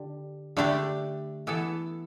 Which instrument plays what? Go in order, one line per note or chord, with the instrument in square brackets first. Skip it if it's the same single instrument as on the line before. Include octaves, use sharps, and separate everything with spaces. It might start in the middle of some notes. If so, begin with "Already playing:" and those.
Already playing: [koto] D3 D4 G4
D3 A3 D4 G4 D5
E3 B3 E4 A4